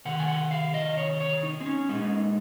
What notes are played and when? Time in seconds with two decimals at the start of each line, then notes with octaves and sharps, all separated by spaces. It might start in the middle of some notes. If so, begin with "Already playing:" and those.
0.05 C3 D#3 F#5
0.20 G#5
0.28 F#5
0.51 F5
0.74 D#5
0.97 C#5
1.20 C#5
1.43 D#4
1.61 C4
1.66 C#4
1.89 A#2 G#3 D#4